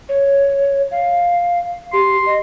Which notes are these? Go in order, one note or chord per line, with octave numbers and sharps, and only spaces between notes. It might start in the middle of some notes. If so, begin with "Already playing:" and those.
C#5
F5
G4 C6
D#5